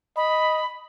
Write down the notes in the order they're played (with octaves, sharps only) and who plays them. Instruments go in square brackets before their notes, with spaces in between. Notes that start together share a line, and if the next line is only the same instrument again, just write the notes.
[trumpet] D#5 [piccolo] B5